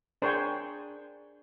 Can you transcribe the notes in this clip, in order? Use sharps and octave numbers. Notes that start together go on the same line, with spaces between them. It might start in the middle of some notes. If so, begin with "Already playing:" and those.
D4 G#4 A#4 C5 C#5 G5